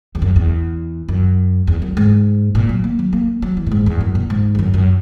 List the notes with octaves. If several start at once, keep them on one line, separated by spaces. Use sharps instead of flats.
E2
F#2
E2
F#2
E2
F#2
G#2
A#2
F#3
A#3
F#3
A#3
F#3
E3
A#2
G#2
E2
F#2
A#2
G#2
E2
F#2
F#2